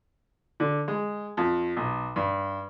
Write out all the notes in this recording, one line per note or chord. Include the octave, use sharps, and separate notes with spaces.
D3
G#3
F2
B1
G2